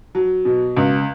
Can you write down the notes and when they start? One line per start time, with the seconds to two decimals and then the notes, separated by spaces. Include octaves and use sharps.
0.15 F#3
0.45 B2
0.76 C#2